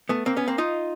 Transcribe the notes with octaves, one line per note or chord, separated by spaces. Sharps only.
A3 B3
A#3 C4
B3 C#4
A#3 C4
D#4 F4